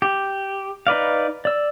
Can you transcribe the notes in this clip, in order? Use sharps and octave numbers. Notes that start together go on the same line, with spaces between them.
G4
D#4 B4 D5 F5
D5 E6